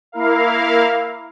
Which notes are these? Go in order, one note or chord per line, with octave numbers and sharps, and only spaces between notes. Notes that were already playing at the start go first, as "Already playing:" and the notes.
A#3 E4 A#4 F5